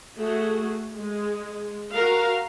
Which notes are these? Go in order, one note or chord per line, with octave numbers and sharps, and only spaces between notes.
A3 F#4 G#4
G#3
F#4 A#4 F5